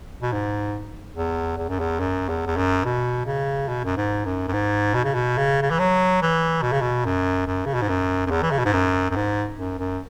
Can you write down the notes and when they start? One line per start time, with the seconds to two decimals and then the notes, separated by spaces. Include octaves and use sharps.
0.22 B2
0.32 G#2
1.16 E2
1.58 E2
1.69 F#2
1.80 E2
2.00 F#2
2.29 E2
2.46 E2
2.57 F#2
2.85 B2
3.26 C#3
3.69 B2
3.85 F#2
3.97 G#2
4.25 F#2
4.48 F#2
4.53 G#2
4.94 B2
5.04 C#3
5.14 B2
5.38 C#3
5.62 C#3
5.70 E3
5.79 F#3
6.22 E3
6.63 B2
6.72 C#3
6.81 B2
7.05 F#2
7.47 F#2
7.66 C#3
7.74 B2
7.82 G#2
7.89 F#2
8.27 F#2
8.31 E2
8.42 E3
8.51 C#3
8.59 B2
8.65 G#2
8.73 F#2
9.11 F#2
9.16 G#2
9.58 F#2
9.79 F#2